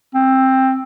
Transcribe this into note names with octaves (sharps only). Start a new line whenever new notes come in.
C4